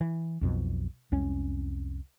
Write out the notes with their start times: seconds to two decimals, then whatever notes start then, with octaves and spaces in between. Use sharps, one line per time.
0.01 E3
0.41 B1 F2 B2
1.12 C2 F2 G#3 C#4